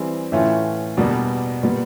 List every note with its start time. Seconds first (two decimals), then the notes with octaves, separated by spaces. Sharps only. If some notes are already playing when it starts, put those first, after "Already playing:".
Already playing: E3 G3 C4 G#4
0.32 A2 E3 A3 C#4 F4
0.97 E2 B2 G3 A#3 D4
1.63 A#2 G3 B3